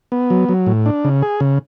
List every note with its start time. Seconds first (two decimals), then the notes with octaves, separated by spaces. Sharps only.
0.12 B3
0.30 F#3
0.49 F#3
0.66 A2
0.86 D4
1.04 C#3
1.22 G#4
1.40 C#3